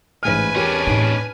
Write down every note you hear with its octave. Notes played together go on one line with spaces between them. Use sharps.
A1 G#2 B4 G#5 F6
E2 C#4 D4 G4 A#4
A2 D#4